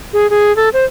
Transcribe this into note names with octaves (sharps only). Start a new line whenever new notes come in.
G#4
G#4
A4
C5